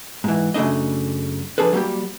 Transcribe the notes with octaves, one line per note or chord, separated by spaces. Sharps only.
G#2 E3
F#2 C#3 A3 D4 D#5
F3 G3 D4 G#4 A4 B4
F#3 G3 A#3 G4